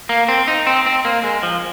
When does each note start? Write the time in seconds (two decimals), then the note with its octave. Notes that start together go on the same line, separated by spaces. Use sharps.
0.09 A#3
0.28 C4
0.48 D#4
0.67 C4
0.86 C4
1.05 A#3
1.24 G#3
1.43 F3